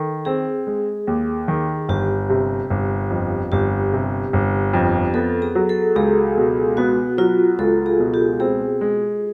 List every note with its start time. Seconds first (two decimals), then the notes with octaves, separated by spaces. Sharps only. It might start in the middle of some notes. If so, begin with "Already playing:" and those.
Already playing: D#3 A4
0.25 C4 G#4
0.67 G#3
1.07 D#2
1.48 D#3
1.89 G1 G4
2.30 C3
2.70 G1
3.10 F2
3.52 G1 G4
3.93 C3
4.33 G1
4.73 F2
5.14 B3 A4
5.42 G#4
5.55 F#3
5.69 A4
5.96 C#2 G#4
6.37 B2
6.77 B3 F#4
7.18 F#3 F4
7.58 C#2 A4
7.86 G#4
7.99 B2
8.14 G4
8.40 C4 G#4
8.81 G#3